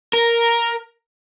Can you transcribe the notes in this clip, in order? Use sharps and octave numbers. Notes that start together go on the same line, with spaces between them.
A#4